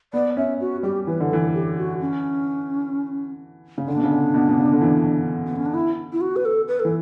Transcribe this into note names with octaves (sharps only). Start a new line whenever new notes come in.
B3 D5
C#4 E5
F#4
G3 G4
E3 B4
D3
E3 A4
G4
F#4
C#4
C#3
D3 D4
B2
C#3
D3
B2
B2
C#3
D3
E3
B3
C#4
D4
E4
E4
F#4
B4
A4
B4
A4
E3